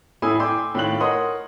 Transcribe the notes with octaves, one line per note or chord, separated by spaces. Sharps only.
A2 A3 E4 G#5 D#6 E6
G5 G#5 C6 D6 E6 G6
A2 D#3 F4 G5 F#6 F#7
A#4 C#5 D#5 F#5 C6 D#6